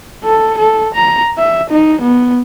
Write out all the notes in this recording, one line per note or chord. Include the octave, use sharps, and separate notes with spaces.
A4
A4
A#5
E5
D#4
B3